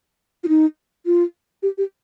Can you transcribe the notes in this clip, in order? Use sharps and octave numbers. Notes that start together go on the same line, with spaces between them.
F4
D#4
F4
G4
G4